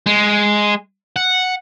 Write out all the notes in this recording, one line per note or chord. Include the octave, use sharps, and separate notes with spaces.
G#3
F#5